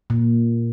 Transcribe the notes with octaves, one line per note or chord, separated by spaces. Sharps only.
A#2